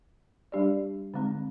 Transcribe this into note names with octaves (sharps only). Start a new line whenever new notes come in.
G3 D4 G4 D5
D3 G#3 C4